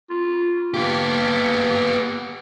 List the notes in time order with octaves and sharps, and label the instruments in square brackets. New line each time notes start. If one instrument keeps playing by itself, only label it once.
[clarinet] F4
[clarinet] A#3 [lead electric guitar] B3 G4